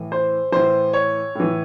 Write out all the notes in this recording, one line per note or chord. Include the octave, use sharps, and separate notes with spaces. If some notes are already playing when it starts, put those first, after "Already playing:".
Already playing: A2 E3
C5
A2 E3 C5
C#5
A2 E3